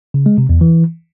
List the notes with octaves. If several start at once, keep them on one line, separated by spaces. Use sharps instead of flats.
C#3
G#3
C3
E2
E3